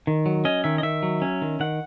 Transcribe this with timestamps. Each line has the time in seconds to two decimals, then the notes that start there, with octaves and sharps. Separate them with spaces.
0.07 D#3
0.26 F#3
0.45 C#4 D#5
0.64 D#3 E5
0.78 D#5
0.83 D#3 E5
1.03 F#3
1.22 C#4
1.42 D#3
1.60 D#3 F#5